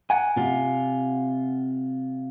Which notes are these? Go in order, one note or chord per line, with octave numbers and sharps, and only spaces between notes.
F#5 G#5
C3 F4